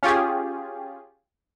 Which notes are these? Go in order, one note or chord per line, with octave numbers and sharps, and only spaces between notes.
C#4 F4 G4 G#4